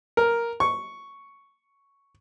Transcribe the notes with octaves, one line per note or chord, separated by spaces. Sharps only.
A#4
C#6